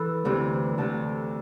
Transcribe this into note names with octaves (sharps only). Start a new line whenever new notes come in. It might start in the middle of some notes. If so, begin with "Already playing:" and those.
Already playing: E3 A4 B4
D2 C3 E3
D2 C3 E3 A5